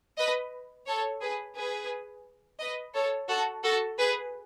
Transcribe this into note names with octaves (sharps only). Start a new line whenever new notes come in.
B4 D#5
A4 C#5
G#4 B4
G#4 B4
B4 D#5
A4 C#5
F#4 A4
F#4 A4
G#4 B4